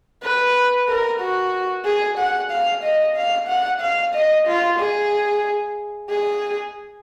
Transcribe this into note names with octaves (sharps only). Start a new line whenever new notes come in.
B4
A#4
F#4
G#4
F#5
F5
D#5
F5
F#5
F5
D#5
F4
G#4
G#4